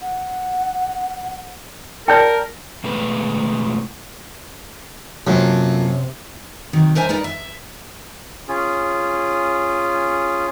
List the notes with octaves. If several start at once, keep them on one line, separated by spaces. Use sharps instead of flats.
F#5
A#4 D5 G5 A5 G6
B2 E3 G#3 A3 B4
F#2 C3 A#3 F4 A4
C3 D#3 F#3
D4 A#4 C5 E5 G#5
D#4 A#4 B4 D5 F5
E5
C#4 F4 G#4